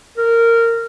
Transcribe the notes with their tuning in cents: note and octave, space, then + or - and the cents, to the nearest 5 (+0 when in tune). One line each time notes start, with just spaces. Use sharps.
A#4 -15